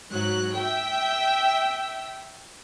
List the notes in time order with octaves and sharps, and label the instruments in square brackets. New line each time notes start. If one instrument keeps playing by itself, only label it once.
[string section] G#2 F#3 F#6
E5 G5